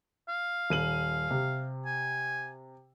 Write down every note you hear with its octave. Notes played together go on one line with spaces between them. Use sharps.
F5
D#1 D#7 F#7
C3
G#5